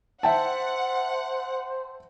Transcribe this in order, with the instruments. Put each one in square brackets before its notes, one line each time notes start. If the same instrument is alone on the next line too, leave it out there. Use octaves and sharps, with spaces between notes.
[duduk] C5 [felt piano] E5 G5 A5 [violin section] F#5